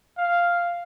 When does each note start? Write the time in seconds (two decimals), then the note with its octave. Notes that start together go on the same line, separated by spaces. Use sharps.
0.18 F5